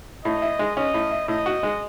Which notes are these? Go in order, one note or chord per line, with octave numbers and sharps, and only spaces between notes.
A2 D#5
E4
G#3
C#4 D#5
A2
E4
A2 D#5
F#4
G#3